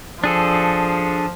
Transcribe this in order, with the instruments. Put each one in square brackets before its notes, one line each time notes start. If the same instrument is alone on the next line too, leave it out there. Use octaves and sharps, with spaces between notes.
[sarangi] F3 [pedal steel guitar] D4 G#4 A4